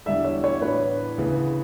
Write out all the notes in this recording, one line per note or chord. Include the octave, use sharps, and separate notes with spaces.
E2 D3 G3 D4 E5
C#5
C#5
A2 E3 B3 D4 B4
D2 C#3 E3 B3